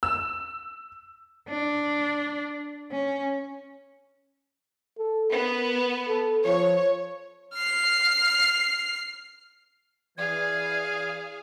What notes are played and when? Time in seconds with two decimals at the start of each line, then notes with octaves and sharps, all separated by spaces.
0.03 E6
1.48 D4
2.92 C#4
4.98 A4
5.31 B3 A#4
6.08 A4
6.45 F3 C#5
7.55 F6 C7
10.18 E3 G#4 D5 F5 G#6